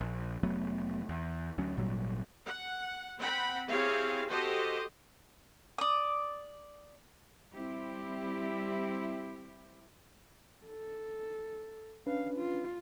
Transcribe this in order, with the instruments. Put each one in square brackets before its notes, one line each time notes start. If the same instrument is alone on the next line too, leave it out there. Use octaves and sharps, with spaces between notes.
[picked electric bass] A#1
F1 F#3 A3 B3
E2
D2 F#3 C#4
G#1 A#2 F#3 G3
[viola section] F#5
C4 F#5 G5 B5
C4 E4 G4 G#4 C#5 F5
F#4 G4 A4 C5 D#5
[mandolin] D5 D#6
[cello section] G3 C4 E4 G4
[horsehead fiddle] A4
[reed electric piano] C#4 D4 B4 [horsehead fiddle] F5
[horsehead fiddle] F4